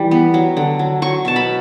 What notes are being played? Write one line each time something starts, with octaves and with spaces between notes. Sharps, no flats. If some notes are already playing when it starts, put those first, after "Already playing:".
Already playing: E3 G3
B3
F#3
D3
F#3
F#3 C#6
B2 A5
B5